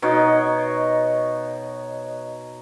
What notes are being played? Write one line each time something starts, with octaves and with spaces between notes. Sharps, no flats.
B2 D#4 C#5